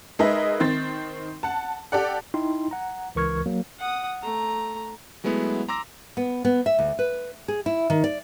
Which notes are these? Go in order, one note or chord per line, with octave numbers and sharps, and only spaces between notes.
G#3 D#4 A#4 B4 D#5 E5
D#3 C4 A6
F#5 A5
G4 A4 D5 F#5
D#4 E4 G5 C6
F#5 A#5
C#2 E3 A#4 C#6 F6 G#6
F#3 A#3
F#5 D#6
A3 A#5
F#3 G#3 A3 B3 E4
A#5 C6 D6 E6 A#6
B3
B3
E5
D2
B4
G#4
E4
D#3
D5